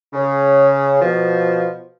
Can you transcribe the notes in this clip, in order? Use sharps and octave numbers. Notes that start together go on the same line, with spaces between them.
C#3
B2 F3